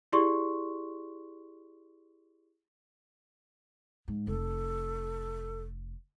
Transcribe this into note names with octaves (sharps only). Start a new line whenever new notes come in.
E4 G4 G#4 D5 C6 C#6
G#2
F1 A4